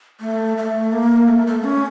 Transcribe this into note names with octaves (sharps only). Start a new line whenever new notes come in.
A3
A3
A#3
A3
A3
C#4